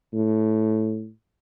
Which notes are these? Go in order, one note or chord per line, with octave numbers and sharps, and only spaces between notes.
A2